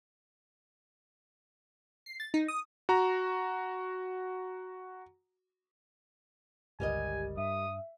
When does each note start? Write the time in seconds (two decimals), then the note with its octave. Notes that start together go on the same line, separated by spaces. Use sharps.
2.06 C7
2.20 A6
2.34 D#4
2.48 D#6
2.89 F#4 A#5
6.80 G1 C#2 G3 G4 A#4 D#5 G#5
7.37 G2 E5 D#6